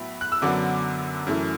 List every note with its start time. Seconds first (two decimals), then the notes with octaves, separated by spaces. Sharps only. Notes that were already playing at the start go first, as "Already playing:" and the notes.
Already playing: A2 F#3 B3 E5
0.21 F#6
0.32 E6
0.42 F#2 D3 F#3 B3 D6
1.27 F#2 E3 A3